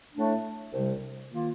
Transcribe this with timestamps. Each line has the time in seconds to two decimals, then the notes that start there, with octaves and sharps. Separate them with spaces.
0.14 A2 A3 D4
0.73 C2 C3 G3
1.31 D#3 A#3 F4